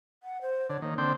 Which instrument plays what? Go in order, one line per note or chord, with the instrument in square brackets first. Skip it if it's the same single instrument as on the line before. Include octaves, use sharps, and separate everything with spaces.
[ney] F#5
C5
[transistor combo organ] D3 [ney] C#5
[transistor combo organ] D#3 [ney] A#3
[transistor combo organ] D3 C4 G5